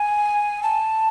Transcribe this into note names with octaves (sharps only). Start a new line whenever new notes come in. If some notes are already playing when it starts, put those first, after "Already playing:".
Already playing: G#5
A5